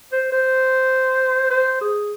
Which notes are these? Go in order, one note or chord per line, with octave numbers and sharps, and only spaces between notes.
C5
C5
C5
G#4